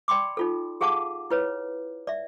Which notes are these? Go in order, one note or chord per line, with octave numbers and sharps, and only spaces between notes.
D5 G5 B5 C6 D6
D#4 F4 A4
G4 G#4 F5 F#5 A5 D6
E4 B4 C#5
D5 E5